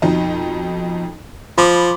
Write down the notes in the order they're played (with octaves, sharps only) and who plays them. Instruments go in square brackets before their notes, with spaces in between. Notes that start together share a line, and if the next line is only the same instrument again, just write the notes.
[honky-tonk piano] F2 B2 D#4
[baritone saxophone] F3 [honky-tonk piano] B5 C6 D6